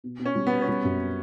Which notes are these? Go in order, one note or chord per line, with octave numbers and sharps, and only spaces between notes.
B2
B2
C#4
G3
B3
B2
C#4
G3 B3
F#2